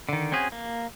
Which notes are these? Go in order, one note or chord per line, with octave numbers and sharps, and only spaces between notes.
D3 D#3
C4 C#4 F#4 G#4
A#3